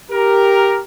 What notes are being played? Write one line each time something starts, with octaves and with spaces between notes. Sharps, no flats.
G4 A#4